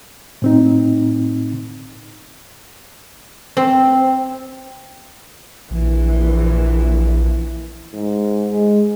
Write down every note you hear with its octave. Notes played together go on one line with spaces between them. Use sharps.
A2 C4 D#4
C4
A#1 E3
G#2
G#3